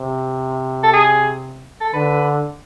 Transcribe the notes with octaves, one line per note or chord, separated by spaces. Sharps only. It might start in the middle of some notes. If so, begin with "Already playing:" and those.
Already playing: C3
A4
G#4
A4
D3 B4